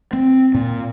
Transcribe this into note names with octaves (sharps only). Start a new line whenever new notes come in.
C4
A#2